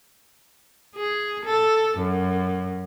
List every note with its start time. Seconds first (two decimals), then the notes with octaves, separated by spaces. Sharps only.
0.96 G#4
1.45 A4
1.98 F#2